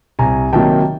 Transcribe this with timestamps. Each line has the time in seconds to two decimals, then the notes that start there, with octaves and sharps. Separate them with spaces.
0.19 C2 G#5 A#5
0.53 C3 D#3 F#3 A#3 G5 A5